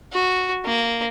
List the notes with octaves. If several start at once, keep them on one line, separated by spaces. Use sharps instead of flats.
F#4
A#3